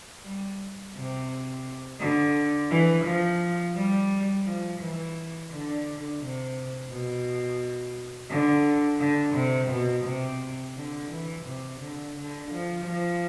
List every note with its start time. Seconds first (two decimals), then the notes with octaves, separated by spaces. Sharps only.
0.24 G3
0.95 C3
2.00 D3
2.71 E3
3.05 F3
3.75 G3
4.45 F3
4.81 E3
5.51 D3
6.21 C3
6.90 B2
8.30 D3
9.00 D3
9.35 C3
9.70 B2
10.05 C3
10.76 D3
11.11 E3
11.46 C3
11.80 D3
12.16 D3
12.51 F3
12.85 F3